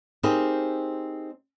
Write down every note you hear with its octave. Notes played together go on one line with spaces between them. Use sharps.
C4 D#4 G4 G#4 A#4